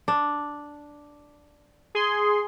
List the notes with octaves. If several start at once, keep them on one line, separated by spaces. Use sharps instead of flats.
D4
G#4 C6